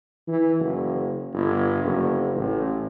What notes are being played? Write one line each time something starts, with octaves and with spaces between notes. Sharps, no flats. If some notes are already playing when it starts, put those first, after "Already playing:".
E3
F#1
G1
F#1
A1